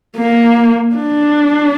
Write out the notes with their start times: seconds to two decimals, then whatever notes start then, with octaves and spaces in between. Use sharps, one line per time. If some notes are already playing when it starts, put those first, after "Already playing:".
0.17 A#3
0.95 D4